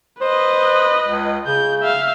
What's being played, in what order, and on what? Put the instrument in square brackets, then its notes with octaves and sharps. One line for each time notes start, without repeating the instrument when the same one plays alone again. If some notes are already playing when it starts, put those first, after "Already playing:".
[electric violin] B4 D#5 [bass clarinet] C5
[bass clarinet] C#2
[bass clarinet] C#3 [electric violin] G6
[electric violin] E5 F5